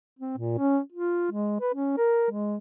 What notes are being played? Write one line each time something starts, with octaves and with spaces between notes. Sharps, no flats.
C4
A#2
C#4
F4
G#3
B4
C#4
A#4
G#3